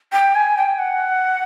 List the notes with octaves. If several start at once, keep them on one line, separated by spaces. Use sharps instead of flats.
G5
G#5
G5
F#5